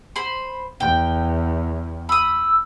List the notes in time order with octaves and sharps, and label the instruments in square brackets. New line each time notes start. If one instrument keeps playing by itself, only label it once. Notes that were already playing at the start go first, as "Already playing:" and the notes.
[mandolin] C5 B5 C6
[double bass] E2 [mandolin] G5
[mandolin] B5 D#6 [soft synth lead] E6